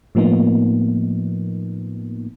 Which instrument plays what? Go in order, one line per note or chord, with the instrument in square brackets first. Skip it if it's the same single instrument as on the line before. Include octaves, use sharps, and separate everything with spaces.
[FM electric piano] A2 F3 A#3 B3 D#4